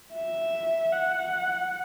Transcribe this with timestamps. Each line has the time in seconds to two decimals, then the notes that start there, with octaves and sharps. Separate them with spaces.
0.14 E5
0.93 F#5